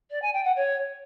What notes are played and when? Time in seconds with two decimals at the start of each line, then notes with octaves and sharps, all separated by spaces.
0.10 D5
0.22 G#5
0.33 G5
0.44 F#5
0.56 C#5